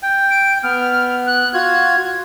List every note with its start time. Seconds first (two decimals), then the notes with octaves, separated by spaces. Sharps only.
0.03 G5
0.30 D7
0.63 B3 F6
1.27 F#6
1.54 F4 F#4 G#6